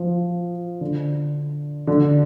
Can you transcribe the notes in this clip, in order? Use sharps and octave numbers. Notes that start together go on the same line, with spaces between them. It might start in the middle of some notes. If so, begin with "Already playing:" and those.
Already playing: F3
D3
D3